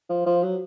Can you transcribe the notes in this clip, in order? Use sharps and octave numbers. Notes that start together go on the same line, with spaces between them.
F3
F3
F#3